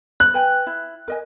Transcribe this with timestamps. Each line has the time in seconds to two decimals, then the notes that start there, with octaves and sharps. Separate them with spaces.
0.20 F#6
0.34 B4 G5 G#5
0.67 E4
1.08 A#4 D#5 G#5